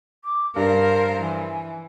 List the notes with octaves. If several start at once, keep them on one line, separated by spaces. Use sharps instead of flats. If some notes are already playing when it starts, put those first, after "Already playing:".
D6
G2 A#4 C5 F5
E3 G#5